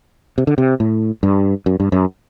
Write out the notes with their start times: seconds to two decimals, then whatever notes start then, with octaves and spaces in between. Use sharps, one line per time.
0.38 C3
0.47 D3
0.58 C3
0.80 A2
1.23 G2
1.66 F#2
1.80 G2
1.92 F#2